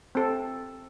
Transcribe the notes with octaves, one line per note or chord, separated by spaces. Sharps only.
C4 A4